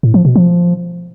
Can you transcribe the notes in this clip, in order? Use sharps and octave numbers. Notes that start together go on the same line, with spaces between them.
A2
F3
B2
F3